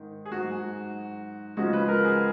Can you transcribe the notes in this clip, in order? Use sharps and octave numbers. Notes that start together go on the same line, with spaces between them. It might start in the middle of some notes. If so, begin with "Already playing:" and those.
Already playing: G#2 D#3
G#4
G#2 F#3 F#4
C#2 C#3 F3 G#3 F#4
B4
A#4
G#4